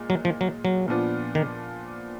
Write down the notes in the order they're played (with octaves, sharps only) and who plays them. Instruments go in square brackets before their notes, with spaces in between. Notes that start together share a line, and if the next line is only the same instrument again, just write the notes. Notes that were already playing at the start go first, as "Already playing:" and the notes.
Already playing: [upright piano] A#2 G#3
[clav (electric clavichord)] F#3
F3
F#3
F#3
[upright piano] A#2 F3 B3 D4 F4
[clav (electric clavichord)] D#3